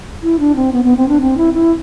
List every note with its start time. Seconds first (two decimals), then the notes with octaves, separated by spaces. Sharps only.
0.23 E4
0.39 D4
0.56 C4
0.73 B3
0.84 B3
0.97 C4
1.08 D4
1.21 C4
1.37 E4
1.54 E4